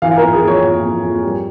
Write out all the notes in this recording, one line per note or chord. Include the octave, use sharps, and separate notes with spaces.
E3 F5
A#4
F2
G#4
F2
C#5
F2
F2
F2
G3